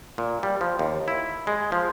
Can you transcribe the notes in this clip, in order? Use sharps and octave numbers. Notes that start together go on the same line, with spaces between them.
A#2
G3
F3
D#2
E4
G#3
F3